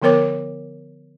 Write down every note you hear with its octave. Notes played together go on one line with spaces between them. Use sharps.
D3 F3 B3 A#4 C#5 D6